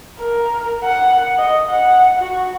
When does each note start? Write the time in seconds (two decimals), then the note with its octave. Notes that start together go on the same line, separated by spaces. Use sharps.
0.20 A#4
0.84 F#5
1.38 D#5
1.69 F#5
2.19 F#4